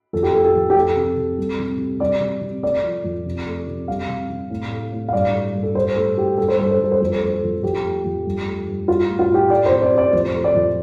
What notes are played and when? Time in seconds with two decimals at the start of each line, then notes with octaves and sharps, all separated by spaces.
0.13 F2 A4
0.23 G4
0.34 A3 A4
0.44 A4
0.55 F2
0.70 G4
0.75 A3 A4
0.97 C3
1.17 C3
1.38 G3
1.59 C3
1.79 C3
2.00 G3 D5
2.21 C3
2.41 C3
2.63 A3 D5
2.84 F3
3.04 F2
3.26 C3
3.46 A3
3.67 C3
3.88 G3 F5
4.09 C3
4.30 C3
4.50 A2
4.71 A3
4.92 A2
5.08 F5
5.13 G2 D5
5.33 A3
5.54 G2
5.63 A4
5.75 G3 C5
5.96 A2 A4
6.17 A2 G4
6.38 G3 A4
6.48 C5
6.59 G2 A4
6.71 C5
6.79 G2 A4
6.92 C5
7.01 F2 A4
7.13 C5
7.21 A3 A4
7.43 F2
7.63 F2 G4
7.84 A3
8.04 F2
8.25 G2
8.47 A3
8.67 G2
8.88 G3 F4
9.09 A2
9.19 F4
9.30 A2 G4
9.50 A3 D5
9.66 C5
9.71 C3
9.82 D5
9.92 C3
9.98 D5
10.13 F2 C5
10.34 A3
10.44 D5
10.55 F2